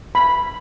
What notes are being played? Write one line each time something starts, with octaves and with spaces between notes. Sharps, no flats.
B5